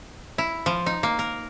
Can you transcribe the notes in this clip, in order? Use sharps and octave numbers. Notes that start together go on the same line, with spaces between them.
E4
F3
D#4
A#3
A#4